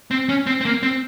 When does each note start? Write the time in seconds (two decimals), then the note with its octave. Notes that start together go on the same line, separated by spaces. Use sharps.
0.11 C4
0.29 C#4
0.46 C4
0.61 C4
0.65 A#3
0.83 C4